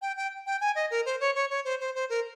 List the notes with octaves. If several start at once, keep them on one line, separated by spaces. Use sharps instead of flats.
G5
G5
G5
G#5
D#5
A#4
C5
C#5
C#5
C#5
C5
C5
C5
A#4